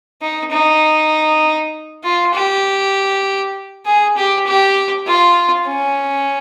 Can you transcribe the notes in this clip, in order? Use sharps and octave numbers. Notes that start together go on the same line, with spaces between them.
D#4
D#4
F4
G4
G#4
G4
G4
F4
C#4